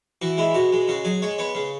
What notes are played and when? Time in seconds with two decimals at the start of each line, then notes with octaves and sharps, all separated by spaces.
0.22 E3 F#4
0.38 G#3 E4
0.54 B2 F#4
0.72 G#3
0.88 C#3 F#4
1.05 F#3 G#4
1.22 G#3 C#5
1.38 B3 C#5
1.55 C#3